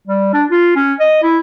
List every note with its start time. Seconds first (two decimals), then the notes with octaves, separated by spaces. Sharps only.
0.07 G3
0.33 D4
0.51 F4
0.76 C#4
1.00 D#5
1.23 E4